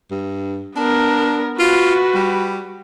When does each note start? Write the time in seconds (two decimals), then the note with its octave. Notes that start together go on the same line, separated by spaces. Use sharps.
0.11 G2
0.76 B3 D4 A#4
1.59 F4 F#4 B4
2.15 G3